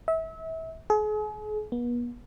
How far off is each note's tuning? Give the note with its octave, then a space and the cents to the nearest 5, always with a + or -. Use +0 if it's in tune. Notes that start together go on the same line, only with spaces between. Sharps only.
E5 -30
G#4 +40
B3 -40